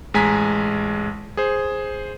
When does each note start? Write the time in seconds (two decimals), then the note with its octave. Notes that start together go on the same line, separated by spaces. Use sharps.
0.14 A1 G#3 G#5 A#5 B6
1.37 G#4 C5